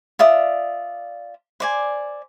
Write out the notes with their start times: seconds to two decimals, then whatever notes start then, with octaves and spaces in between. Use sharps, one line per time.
0.19 F4 D5 E5 D#6
1.60 C5 D5 G#5